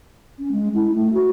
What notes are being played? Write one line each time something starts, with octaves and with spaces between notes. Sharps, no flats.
C#4
G#3
E4
A3
F#4